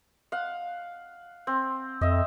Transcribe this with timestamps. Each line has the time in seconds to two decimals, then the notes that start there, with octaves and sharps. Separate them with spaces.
0.32 F5 F#5
1.47 C4
2.01 F2 D#5 E5